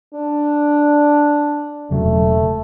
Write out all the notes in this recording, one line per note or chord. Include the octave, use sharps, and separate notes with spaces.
D4
E1 C#3 F#3 A3